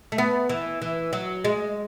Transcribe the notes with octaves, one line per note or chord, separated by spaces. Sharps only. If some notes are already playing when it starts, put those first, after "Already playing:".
A3
B3
E3
E3
F#3
G#3